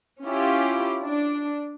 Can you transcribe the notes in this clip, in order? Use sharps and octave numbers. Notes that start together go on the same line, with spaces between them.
C#4 E4 F4 G4
D4